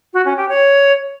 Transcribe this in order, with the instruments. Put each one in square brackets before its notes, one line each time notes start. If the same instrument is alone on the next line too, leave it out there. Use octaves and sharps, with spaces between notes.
[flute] F#4
C#4
G4
C#5